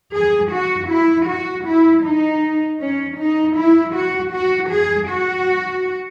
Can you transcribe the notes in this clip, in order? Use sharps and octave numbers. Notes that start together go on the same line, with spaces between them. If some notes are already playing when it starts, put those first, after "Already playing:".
G#4
F#4
E4
F#4
E4
D#4
C#4
D#4
E4
F#4
F#4
G#4
F#4